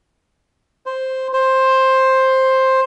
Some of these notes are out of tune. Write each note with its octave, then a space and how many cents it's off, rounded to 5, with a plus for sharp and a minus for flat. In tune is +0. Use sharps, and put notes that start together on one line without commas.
C5 +0
C5 +10